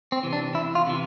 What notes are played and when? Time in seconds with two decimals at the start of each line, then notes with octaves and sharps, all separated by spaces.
0.12 C4
0.23 C3 E3
0.33 D4
0.54 E2 E4
0.75 F4
0.87 C3 E3